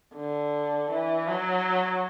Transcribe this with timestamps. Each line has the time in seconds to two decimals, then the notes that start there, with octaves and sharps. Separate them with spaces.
0.15 D3
0.91 E3
1.28 F#3